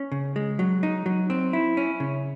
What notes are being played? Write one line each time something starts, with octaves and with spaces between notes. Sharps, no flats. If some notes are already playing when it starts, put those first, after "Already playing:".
Already playing: C#4
C#3
G#3
F#3
D#4
F#3
C4
E4
C#4
C#3